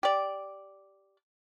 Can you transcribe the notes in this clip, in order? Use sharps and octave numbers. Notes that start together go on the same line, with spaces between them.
G4 D5